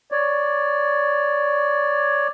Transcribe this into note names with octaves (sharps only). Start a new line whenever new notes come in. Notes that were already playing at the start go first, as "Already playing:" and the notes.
C#5 D5